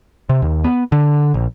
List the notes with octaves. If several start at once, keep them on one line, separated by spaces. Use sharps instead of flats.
C3
D#2
B3
D3
A#1